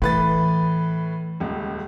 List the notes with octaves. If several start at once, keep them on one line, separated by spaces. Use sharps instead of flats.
A2 E3 B4 A6
D#1 C#2